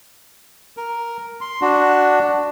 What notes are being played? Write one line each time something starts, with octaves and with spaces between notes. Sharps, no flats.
A#4
C6
D4 F#4